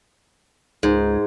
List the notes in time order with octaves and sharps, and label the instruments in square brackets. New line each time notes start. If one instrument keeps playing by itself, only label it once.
[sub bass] C#2 [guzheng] G#2